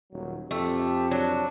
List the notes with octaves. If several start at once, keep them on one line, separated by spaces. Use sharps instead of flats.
D#1 F#3
F2 A3 G4
F#3 D4